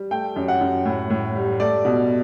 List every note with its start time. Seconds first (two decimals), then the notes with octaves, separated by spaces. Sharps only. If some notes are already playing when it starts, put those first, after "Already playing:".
Already playing: G3
0.11 A3 G5
0.36 F#2
0.48 F#5
0.61 F#2
0.85 A2
1.10 A2
1.35 G3
1.60 A3 D5
1.85 B2